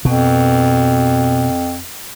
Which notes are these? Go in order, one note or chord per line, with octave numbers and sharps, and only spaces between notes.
F2 B2